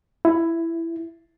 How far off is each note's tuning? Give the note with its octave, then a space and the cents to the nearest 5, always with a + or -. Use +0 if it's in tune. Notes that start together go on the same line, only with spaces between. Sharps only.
E4 +10